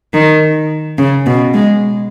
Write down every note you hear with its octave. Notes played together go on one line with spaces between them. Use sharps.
D#3
C#3
B2
G#3